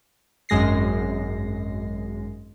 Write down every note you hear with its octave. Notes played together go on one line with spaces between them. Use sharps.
G#1 F#2 G#3 A#6 C7